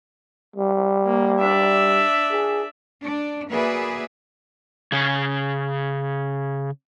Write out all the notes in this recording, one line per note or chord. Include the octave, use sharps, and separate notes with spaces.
G3
A#3
D4 E5
G#4
D4
A#3 F#4 G#4 B4 D5 E5
C#3 C#5